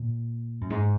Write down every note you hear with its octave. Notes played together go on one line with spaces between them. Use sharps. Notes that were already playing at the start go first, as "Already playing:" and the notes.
Already playing: A#2
F#2
G#2